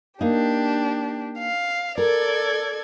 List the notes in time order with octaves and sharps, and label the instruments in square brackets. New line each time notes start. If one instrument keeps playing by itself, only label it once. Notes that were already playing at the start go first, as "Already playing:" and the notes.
[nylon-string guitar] A#3 D#4 [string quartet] D4 G4
[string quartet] F5
[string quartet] A4 D5 G#6 [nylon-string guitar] A#4